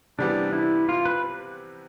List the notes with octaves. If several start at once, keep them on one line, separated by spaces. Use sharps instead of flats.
C3 E3 G3 B3 D4
E4
F4
B4